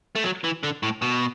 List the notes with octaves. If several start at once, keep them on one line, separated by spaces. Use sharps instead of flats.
A3
F#3
E3
D3
A2
B2